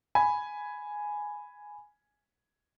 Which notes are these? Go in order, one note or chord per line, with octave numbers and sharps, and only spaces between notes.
G#5 B5